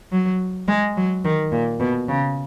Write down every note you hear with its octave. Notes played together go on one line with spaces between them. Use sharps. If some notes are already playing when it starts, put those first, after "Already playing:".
F#3
G#3
F#3
D#3
A#2
B2
C#3